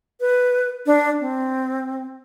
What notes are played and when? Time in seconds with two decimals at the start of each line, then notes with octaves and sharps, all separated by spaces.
0.20 B4
0.86 D4
1.20 C4